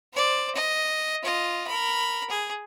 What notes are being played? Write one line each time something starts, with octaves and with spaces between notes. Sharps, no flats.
C5 D5
D#5
F4 D#5
A#4 B5
G#4